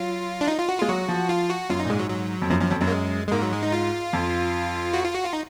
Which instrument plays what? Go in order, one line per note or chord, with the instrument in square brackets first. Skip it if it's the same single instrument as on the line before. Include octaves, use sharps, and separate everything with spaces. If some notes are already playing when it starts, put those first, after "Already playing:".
Already playing: [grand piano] F#3 [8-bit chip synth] F4
[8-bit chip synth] D4
D#4
F4
F#4
[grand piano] G#3 [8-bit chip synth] F4
[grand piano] F#3 [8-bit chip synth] F#4
[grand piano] F3
[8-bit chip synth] F4
F#4
[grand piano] F#2 [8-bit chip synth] F4
[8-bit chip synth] D#4
[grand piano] A#2
[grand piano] G#2 [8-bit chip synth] G#3
[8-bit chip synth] F#3
F#3
[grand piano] F2
[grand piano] F#2 [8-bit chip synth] F3
[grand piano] F#2 [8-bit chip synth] F3
[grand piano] F2 [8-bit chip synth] F#3
[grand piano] F#2 [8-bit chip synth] F#3
[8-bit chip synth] A#3
G#3
G#3
[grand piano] G#2 [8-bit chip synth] A#3
[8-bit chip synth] F#3
G#3
D#4
F4
[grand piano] F2
[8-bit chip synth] F#4
F4
F#4
F4
D#4